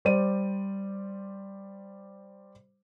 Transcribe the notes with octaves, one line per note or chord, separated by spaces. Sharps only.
G3 C5 D5 D#7